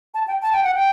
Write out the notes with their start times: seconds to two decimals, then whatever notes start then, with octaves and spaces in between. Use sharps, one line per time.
0.14 A5
0.28 G5
0.42 A5
0.53 G5
0.63 F#5
0.74 G5